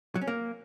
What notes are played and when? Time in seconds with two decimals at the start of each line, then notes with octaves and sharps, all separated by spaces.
0.15 F#3
0.21 C#4
0.27 A#3